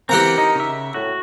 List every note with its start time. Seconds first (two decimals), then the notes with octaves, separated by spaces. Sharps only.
0.09 E3 C4 G4 A#4 F#5 A#5
0.38 D#4
0.55 C#3 E5
0.94 A2 F#4